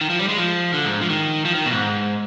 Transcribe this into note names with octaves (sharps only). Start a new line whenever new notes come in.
D#3
F3
G3
G#3
F3
D3
G#2
F3
D#3
F3
D#3
B2
G#2